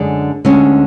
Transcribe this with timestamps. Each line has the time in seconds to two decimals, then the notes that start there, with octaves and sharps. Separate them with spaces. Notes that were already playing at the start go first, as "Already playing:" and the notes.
Already playing: F#2 D3 G#3 D4 G#4
0.45 D2 D3 G#3 C#4